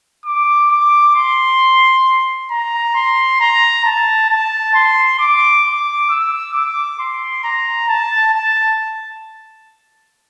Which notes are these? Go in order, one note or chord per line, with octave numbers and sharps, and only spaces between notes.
D6
D6
C6
A#5
C6
A#5
A5
A5
C6
D6
D6
E6
D6
C6
A#5
A5
A5